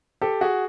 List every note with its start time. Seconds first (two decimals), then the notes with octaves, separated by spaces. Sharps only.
0.22 G4 A4
0.41 F#4 G#4